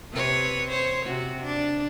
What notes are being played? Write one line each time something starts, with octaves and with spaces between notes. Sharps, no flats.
C3 B4 C#5
C5 C#5
C3 F#4
D4